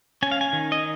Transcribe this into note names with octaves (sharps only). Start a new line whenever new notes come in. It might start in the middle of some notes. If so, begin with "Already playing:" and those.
C#4 G#5
F5
G#5
D#3
D#5